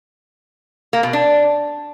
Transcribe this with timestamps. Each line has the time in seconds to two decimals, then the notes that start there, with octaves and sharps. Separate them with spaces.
0.93 A#3
1.03 B2
1.13 D4